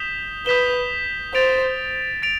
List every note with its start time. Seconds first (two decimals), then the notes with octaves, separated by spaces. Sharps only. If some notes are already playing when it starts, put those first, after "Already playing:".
Already playing: D#6 G6 B6 E7 G7
0.46 B4 D#6 G6 B6 E7 G7
1.34 C5 A6 D7 F7
2.22 A6 D7 F7